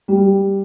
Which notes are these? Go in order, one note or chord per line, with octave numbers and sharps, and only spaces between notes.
G3